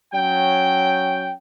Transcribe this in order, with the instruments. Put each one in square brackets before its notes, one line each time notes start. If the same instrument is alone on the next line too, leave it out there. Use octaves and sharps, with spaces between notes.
[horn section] F#3 C#4 G5